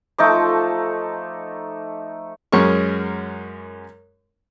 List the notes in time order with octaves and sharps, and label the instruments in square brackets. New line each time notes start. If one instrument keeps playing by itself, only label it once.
[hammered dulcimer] F3 A4 C5 [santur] A3 D#4 D6
[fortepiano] F#2 G#3 C#4 A#4 C#6